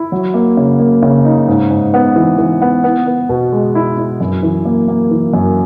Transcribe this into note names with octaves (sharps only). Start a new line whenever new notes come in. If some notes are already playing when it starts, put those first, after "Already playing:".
Already playing: E4
F#3
A#3
C#3
A#3
C#3
D#4
G#2
G#2
B3
E3
E3
B3
B3
B3
B2
G#3
E4
E4
F#2
E3
A#3
A#3
E3
F#2